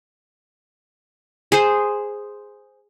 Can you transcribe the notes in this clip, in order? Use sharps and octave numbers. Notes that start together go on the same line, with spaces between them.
G#4 C5